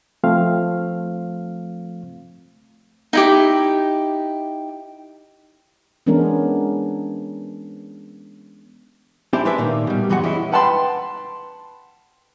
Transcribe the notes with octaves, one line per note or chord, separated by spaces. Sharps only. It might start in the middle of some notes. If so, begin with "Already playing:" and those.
F3 A3 C4 F5
D#4 E4 G4
E3 G#3 B3 C#4 D4 A#4
C#4 D4 E4 G4 C5 D5
G#3 D4 B4 E5
A#2 D#3 A#3
B2 G3
F#2 E3 G3 G#3 F#4 F#5
E3 G#3 C#4 E4
B4 F#5 G5 A5 B5 C6